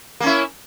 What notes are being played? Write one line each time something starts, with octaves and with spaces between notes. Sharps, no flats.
A#3 C#4 E4